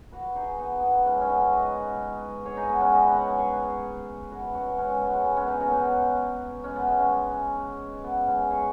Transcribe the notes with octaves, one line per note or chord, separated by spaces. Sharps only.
F#4 B4
D#4 G#4
B3 D#4
B3
B3
B3
G#3 C#4
C#4
B3 D#4
B4 D#5
G#4 C#5
D#4 G#4
B3
G#3 C#4
B4 D#5
C#5 F#5
G#4 C#5
F#4 B4
C#4 F#4
G#3 C#4
G#3 C#4
B3
G#3
B3
G#3 C#4
B3 D#4
C#4 F#4
B3 D#4
G#3 C#4
B3
G#3
G#3 C#4
B3
G#3 C#4
G#4 C#5